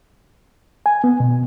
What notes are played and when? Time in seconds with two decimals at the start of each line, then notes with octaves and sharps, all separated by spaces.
0.86 G#5
1.04 B3
1.20 B2